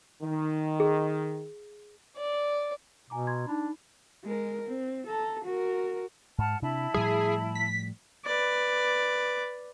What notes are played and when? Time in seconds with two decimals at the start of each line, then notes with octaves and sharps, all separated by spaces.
0.23 D#3
0.80 G#4
2.17 D5
3.10 B2 G#5 A#5 D6
3.27 A#5 C6 G#6
3.47 D4 D#4 B5
4.24 G#3 A#4
4.67 C4
5.07 A4 A#5
5.45 F#4 A#4
6.38 G#2 F#5 A5 F6
6.62 C3 D4 E4 A5 B5
6.94 A2 F3 G3 G#4
7.55 B6
8.25 B4 D5